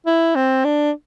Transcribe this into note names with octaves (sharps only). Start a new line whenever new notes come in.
E4
C4
D4